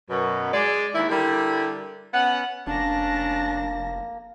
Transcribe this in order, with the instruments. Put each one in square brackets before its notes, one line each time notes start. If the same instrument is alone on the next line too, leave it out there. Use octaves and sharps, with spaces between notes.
[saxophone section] F#2 B2
G#3 D5
D#2 E4
D3 G3 E4 G4 A#4
B3 C#4 F#5
[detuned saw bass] F1 [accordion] A#3 [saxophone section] C#4 D4 [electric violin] A5 A#6